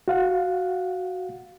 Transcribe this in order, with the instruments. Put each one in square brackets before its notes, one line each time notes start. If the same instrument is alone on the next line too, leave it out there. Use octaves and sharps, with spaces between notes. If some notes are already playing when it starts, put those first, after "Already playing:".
[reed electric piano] F#4 F5 F#5